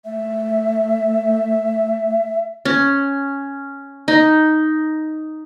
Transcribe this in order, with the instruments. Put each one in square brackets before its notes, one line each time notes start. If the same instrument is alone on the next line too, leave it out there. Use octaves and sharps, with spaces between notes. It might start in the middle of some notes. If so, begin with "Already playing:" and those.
[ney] A3 [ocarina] E5
[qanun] C#4
D#4